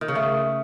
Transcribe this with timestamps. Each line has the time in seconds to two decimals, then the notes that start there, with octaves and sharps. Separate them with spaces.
0.01 D#3
0.08 C#3
0.15 A3